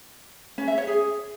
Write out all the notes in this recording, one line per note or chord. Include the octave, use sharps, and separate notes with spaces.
C#4
E5
C#5
G#4